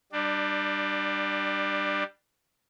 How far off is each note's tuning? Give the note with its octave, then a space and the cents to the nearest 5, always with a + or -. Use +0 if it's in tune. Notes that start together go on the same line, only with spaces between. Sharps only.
G3 +0 D4 +25